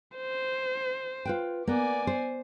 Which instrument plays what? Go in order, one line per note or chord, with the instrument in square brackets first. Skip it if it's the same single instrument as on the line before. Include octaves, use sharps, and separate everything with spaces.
[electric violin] C5
[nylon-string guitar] F4 B4 G5
[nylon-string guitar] A#3 B3 [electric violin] D5 G#5
[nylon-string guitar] C5